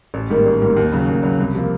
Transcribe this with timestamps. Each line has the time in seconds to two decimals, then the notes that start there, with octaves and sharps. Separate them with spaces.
0.14 A1
0.30 G#2 D#3 G3 A#3
0.46 A1
0.62 G#2 D#3 G3 A#3
0.77 D#2
0.92 C#3 F#3
1.08 D#2
1.23 C#3 F#3
1.39 C2
1.55 C3 F3 A#3